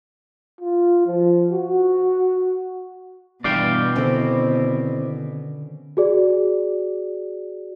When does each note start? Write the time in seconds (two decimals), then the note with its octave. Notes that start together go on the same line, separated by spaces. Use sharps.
0.61 F4
1.06 F3
1.52 F#4
3.44 G1 G2 B2 E3 D5 F5 G5
3.95 D3 D#3 C4 C#4 E4 G4
5.97 F#4 G#4 D5